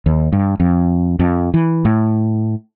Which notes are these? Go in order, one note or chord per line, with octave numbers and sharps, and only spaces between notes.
D#2
G2
F2
F2
E3
A2